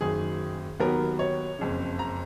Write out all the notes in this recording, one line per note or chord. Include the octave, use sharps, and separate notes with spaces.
F#1 F#2 D#3 G#4
D#2 D#3 F#3 B3 A#4
C#5
F#1 F2 C#3
A#5